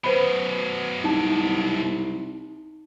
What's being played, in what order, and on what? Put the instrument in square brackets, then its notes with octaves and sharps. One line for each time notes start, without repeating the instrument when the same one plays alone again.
[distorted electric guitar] F#2 B2 [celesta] B4 C5 B5
[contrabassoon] C2 [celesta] D#4 A5